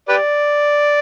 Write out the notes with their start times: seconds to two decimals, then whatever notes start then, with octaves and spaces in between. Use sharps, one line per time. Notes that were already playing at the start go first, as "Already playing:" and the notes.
0.09 G4 B4 D5